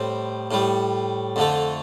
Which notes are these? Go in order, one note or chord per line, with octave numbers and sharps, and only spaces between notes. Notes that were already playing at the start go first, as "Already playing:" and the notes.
Already playing: A2 G3 C4
A2 G3
F2 D3 A3